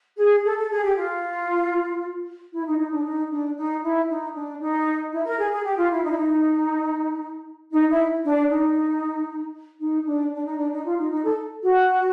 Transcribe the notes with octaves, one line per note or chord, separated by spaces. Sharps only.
G#4
A4
A4
G#4
G4
F4
E4
D#4
D#4
D4
D#4
D4
D#4
E4
D#4
D4
D#4
E4
A#4
G#4
G#4
G4
F4
E4
D#4
E4
D#4
D#4
E4
D4
D#4
D#4
D4
D4
D#4
D4
D#4
F4
D#4
D#4
A4
F#4